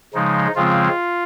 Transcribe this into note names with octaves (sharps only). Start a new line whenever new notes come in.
C#3 F3 G#3 D#4
C#3 F3 G#3 C4 F4